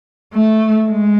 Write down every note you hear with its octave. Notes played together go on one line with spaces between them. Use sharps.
A3
G#3